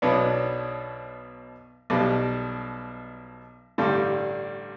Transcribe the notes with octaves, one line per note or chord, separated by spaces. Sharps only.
B1 B2 F#3 B3 D4
B1 B2 G3
A1 G2 D3 G3